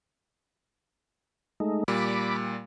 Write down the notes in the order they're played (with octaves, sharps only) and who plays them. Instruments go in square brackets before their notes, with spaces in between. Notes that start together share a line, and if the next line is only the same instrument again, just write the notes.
[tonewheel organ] G#3 A3 D#4
[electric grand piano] A#2 G3 [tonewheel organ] B5 D6